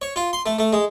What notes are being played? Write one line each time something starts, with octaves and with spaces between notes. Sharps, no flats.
C#5
F4
C6
A3
A3
G#3